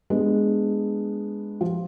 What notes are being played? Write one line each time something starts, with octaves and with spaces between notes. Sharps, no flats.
G#3 B3 D4
F3